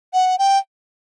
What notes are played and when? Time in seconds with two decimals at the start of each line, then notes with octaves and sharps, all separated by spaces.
0.14 F#5
0.39 G5